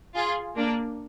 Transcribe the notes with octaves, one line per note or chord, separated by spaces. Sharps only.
F4 G#4
A#3 D4